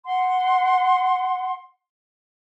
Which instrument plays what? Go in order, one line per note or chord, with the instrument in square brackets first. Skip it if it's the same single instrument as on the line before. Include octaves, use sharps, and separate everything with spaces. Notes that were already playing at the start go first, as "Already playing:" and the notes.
[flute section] F#5 C6